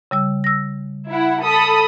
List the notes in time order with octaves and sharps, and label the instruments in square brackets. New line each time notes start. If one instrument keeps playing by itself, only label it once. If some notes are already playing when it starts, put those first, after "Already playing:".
[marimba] C#3 G3 E6
E6 A#6
[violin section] E4 F#5
A4 B5 D#6